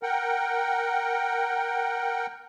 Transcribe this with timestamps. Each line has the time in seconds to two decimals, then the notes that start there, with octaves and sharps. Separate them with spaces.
0.03 A#4 F#5 G5